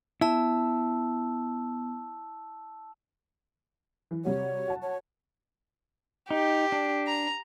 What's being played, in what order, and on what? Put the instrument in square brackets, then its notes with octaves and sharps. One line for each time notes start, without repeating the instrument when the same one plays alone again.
[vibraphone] B3 [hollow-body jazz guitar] E4 [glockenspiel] A5 E6
[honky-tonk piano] E3
[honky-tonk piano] C3 G3 F#4 [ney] C#5
[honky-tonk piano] F#4 A5
[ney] C#5
[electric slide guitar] D#4 [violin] G4
[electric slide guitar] D4
[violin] A#5